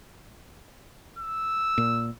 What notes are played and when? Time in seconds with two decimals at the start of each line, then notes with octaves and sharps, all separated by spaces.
1.18 E6
1.78 A#2